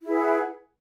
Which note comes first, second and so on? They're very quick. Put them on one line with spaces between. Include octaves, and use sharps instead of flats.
E4 G#4 B4 F#5